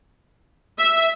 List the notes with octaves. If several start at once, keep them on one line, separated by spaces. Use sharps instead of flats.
E5